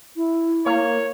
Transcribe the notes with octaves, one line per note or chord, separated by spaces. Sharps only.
E4
A#3 C#5